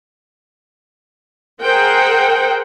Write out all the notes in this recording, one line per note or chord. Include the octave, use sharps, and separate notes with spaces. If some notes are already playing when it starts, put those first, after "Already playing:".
G#4 A#4 C5 F#5 G5